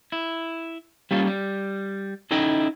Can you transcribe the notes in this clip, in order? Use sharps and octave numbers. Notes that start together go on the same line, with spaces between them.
E4
G3 A#3 C#4 F4 A4
G3
C#4 D#4 E4 A4 D#5 G5